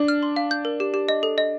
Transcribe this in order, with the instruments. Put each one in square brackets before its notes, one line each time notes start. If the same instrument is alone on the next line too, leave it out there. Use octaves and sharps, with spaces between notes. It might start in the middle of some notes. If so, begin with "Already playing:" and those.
Already playing: [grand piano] D4
[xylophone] F6
C6
F5
G6
A#4
G4
G4
D#5
A4
D#5